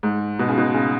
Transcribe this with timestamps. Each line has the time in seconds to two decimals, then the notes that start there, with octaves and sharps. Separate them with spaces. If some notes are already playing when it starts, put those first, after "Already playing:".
0.03 G#2
0.39 B2
0.49 C#3
0.58 B2
0.74 C#3